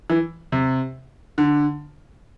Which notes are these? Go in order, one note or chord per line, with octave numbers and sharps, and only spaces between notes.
E3
C3
D3